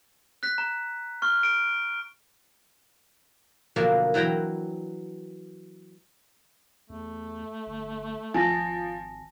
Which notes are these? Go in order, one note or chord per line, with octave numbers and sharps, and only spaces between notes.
F#6 B6
A#5
C#6 F6
D7
B2 D3 F3 F#3 A#3
E3 F#3 G5 A#5 B5
E2 A3
G1
G#1 F3 G#5 A5 A#6